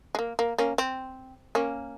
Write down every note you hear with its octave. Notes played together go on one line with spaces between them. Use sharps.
G#3
A#3
A#3
A#3 C#4
C4
A#3 C#4